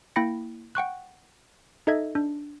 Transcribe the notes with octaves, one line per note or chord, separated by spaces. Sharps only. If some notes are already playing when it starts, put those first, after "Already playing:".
A#3 E4 G5 B5 A#6 C#7
F#5 G5 C#6 F#6
D#4 A4 D#5 E5 G#6
D4